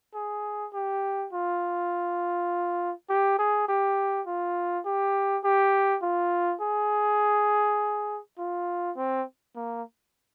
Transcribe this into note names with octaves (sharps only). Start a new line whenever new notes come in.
G#4
G4
F4
G4
G#4
G4
F4
G4
G4
F4
G#4
F4
C4
A#3